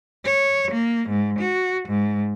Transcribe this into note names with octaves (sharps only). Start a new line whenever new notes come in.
C#5
A#3
G#2
F#4
G#2